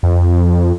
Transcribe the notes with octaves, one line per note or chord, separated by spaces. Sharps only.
F2